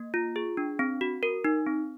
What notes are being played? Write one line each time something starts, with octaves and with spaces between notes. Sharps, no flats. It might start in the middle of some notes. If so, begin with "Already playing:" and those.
Already playing: A#3
F4
G#4
D4
C4
F#4
A#4
D#4
C4